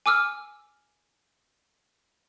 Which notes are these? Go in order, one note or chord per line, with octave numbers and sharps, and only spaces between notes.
G#5 D6 E6 F6